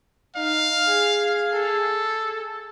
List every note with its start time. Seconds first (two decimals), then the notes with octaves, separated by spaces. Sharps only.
0.36 D#4 F5
0.87 G#4
1.53 A4